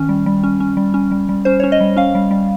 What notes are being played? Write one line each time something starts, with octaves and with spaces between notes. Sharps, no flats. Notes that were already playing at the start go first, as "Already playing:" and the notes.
Already playing: D#3 C#4
G3
G3
C#4
C#4
G3
C#4
G3
G3
C#4 C5
C#4 C#5
D#5
G3
C#4 F5
G3
G3